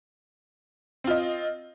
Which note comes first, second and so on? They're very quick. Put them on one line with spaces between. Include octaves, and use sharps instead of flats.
C4 F4 D#5